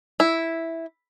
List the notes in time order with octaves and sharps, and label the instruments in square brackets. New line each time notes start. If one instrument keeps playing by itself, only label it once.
[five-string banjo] E4